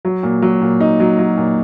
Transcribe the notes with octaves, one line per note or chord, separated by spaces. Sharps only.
F#3
A#2
F#3
A#2
D#4
F#3
F#3
A#2